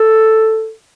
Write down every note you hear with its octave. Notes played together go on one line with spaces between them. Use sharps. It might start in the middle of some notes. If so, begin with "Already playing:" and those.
Already playing: A4